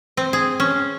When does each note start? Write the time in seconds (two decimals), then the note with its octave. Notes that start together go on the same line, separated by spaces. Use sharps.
0.17 C4
0.33 G#4
0.60 C#4